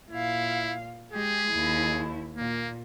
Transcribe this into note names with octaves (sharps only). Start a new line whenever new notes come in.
A#2 E4 F5
G#3 G4 G#4
D#2 E4
A#2 A#3